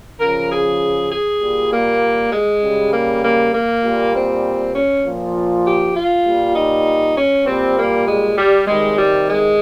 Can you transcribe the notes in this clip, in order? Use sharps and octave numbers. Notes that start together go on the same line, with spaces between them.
C#3 F3 A#4
G#4
G#4
A#2 G3
A#3
G#3
C#3 G3
A#3
A#3
A#3
A#2 G3
C4
C#4
A#2 F3
G4
F4
A#2 G3
D#4
C#4
A#2 G3 C4
A#3
G#3
G3
C3 D#3 G3 G#3
G3
G#3